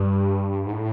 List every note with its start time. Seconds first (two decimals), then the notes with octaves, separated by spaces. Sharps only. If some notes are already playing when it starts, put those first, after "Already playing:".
Already playing: G2
0.66 G#2
0.73 A2